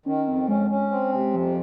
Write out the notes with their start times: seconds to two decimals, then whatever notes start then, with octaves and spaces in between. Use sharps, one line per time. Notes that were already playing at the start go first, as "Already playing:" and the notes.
0.06 D#3 C#4
0.26 F2 C4
0.48 G#3 C#4
0.70 C#4
0.91 C4
1.12 C3
1.34 F2 F3